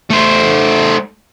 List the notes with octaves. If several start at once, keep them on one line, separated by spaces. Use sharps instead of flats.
A3 C5